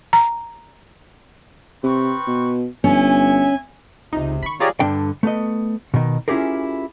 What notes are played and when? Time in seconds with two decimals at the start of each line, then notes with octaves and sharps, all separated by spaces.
0.13 A#5
1.83 C3 C4 B4 C#6
2.27 B2
2.84 G1 C#4 E5 G#5
4.13 C#2 C3 D#4 F4
4.43 D#3 B5 C#6
4.60 F4 G4 G#4 C#5 D5 A#5
4.80 G2 D3 D4 G5
5.23 A3 B3 D#5
5.94 B2 D#3
6.28 C#4 E4 F4 G4 G#4 A#4